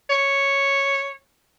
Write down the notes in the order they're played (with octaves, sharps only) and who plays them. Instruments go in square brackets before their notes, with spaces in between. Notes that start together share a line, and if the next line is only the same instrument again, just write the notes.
[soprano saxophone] C#5